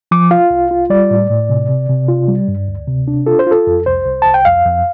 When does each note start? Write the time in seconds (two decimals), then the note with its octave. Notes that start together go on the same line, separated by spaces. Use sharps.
0.11 F3 D6
0.31 F4 F5
0.50 C2
0.71 F4
0.90 G3 D5
1.11 A2
1.30 A2
1.49 C3
1.69 C3
1.89 C3
2.08 F4
2.28 G3
2.48 G2
2.68 D2
2.87 C3
3.08 D4
3.26 F4 A4
3.39 C5
3.47 F4 A4
3.67 F2
3.86 C2 C5
4.05 C2
4.22 C2 A5
4.34 G5
4.45 F2 F5
4.65 F2